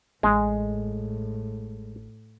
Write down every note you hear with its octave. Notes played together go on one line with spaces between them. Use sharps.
A1 A2 G#3